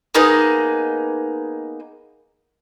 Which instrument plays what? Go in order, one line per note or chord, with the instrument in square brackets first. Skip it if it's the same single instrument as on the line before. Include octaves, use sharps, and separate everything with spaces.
[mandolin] A#3 B3 D#4 G#4